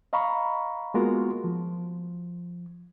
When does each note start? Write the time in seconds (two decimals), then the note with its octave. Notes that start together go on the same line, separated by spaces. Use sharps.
0.13 D#5 F5 A#5 B5 C#6
0.94 G#3 A#3 B3 F4 F#4 A#4
1.44 F3